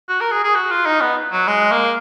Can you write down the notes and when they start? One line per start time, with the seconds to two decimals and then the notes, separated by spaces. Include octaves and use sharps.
0.09 F#4
0.21 A#4
0.32 G#4
0.44 G#4
0.55 F#4
0.71 F4
0.86 D#4
1.01 B3
1.32 F#3
1.48 G#3
1.72 A#3